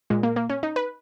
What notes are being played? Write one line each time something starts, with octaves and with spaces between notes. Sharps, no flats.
A#2 G#3
A#3
A#3
C#4
D#4
B4